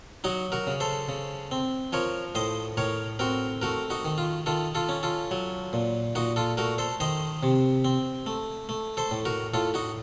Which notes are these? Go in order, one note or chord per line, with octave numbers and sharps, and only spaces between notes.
F#3 D#4 F#4
F#4 A#4
C#3
A4 C5
C#3
C4
F3 A#4 C#5
A2 C5 D#5
A2 A#4 C#5
C4 F#4 A#4
A3 F#4 A#4
D#4 F#4
D#3
F4
D#3 F4 A4
F4 A4
C#4
F4 A4
F#3
A#2
A#2 D#4 F#4
F4 A4
A3 F#4 A#4
A4 C5
D#3 C5 D#5
C3
C4
A3
A3
A4 C5
A2
F#4 A#4
A2 F4 A4
D#4 F#4